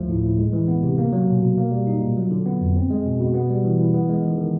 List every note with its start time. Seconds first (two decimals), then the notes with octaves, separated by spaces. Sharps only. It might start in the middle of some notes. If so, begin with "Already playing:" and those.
Already playing: D2 F3 A3
0.09 A2
0.24 A2
0.38 G#3
0.53 E3
0.68 B3
0.83 C3
0.98 A#3
1.13 F#3
1.27 B2
1.42 B2
1.57 A#3
1.71 G3
1.87 D#4
2.01 A#2
2.17 F#3
2.31 D3
2.46 B3
2.60 F2
2.76 C4
2.90 G#3
3.06 B2
3.20 B2
3.34 B3
3.50 G3
3.64 E3
3.79 E3
3.94 B3
4.09 G#3
4.24 D#3
4.38 D#3